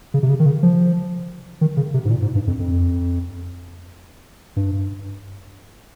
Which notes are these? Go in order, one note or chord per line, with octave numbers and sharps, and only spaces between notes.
C#3
C3
C#3
D#3
C#3
F3
D#3
C#3
C3
G#2
A#2
G#2
G2
F2
F2
G2